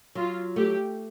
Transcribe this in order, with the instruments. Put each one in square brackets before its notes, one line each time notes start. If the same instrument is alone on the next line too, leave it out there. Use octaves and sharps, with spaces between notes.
[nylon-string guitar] F#3 [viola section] F4
[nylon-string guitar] A3 [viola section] G4